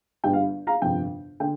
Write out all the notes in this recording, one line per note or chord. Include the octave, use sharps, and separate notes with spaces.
G1 G2 G3 G5
F5
F5 A#5
G1 F2 C3 F3 G5
D3 G5